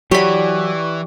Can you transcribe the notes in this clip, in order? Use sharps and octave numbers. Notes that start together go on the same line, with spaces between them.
E3 F#3 G4 D5 B5 C#6